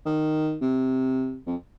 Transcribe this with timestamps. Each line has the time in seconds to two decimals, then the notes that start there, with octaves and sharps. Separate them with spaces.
0.06 D#3
0.62 C3
1.47 F2